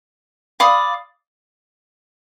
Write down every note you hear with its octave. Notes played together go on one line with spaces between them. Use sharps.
D5 F5 B5 D#6